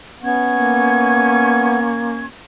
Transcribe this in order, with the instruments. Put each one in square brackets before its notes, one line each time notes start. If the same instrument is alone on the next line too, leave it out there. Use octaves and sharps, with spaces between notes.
[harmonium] B3 [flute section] C#4 C#6 G#6
[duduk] A#3